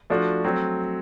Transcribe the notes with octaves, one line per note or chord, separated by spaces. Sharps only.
F3 A3 D4 F#4
F#3 A3 C4